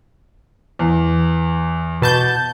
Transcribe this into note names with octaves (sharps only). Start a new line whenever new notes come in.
E2
B2 A5 G6